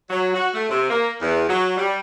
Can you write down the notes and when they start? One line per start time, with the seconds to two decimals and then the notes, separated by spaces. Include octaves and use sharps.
0.10 F#3
0.34 F#4
0.54 A3
0.69 C3
0.90 A#3
1.21 E2
1.49 F#3
1.77 G3